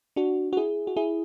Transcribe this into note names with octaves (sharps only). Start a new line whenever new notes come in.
D4 F#4
F#4
E4 G#4
F#4
E4 G#4